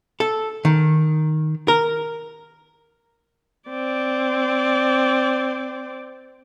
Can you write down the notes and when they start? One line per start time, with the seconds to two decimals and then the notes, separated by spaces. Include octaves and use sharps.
0.20 A4
0.65 D#3
1.68 A#4
3.69 C4 D5